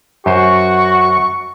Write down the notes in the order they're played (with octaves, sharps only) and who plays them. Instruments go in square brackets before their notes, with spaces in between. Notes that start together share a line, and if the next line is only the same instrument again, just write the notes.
[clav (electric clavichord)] F#2 C5 [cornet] F#4 [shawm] C#6